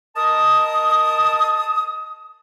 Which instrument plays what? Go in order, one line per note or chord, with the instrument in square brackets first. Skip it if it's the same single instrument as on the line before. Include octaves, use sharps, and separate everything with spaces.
[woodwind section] A#4 D#5 A5 D#6